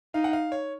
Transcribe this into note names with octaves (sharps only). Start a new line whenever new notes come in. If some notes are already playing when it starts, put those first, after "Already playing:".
D#4 F5
F#5
F5
C#5